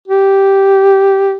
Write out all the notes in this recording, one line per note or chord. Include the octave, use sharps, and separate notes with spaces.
G4